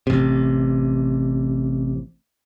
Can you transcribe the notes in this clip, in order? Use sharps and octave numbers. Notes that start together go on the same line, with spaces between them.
A1 C3